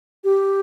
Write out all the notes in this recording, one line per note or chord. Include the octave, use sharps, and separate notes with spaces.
G4